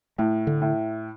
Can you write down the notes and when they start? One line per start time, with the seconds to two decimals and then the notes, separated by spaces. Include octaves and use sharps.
0.18 A2 A3
0.47 D3
0.62 A2